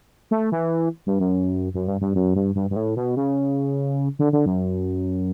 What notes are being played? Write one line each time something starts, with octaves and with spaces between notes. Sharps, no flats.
A3
E3
G2
F#2
F#2
G2
G2
F#2
G2
G2
G2
A2
B2
C#3
D3
D3
F#2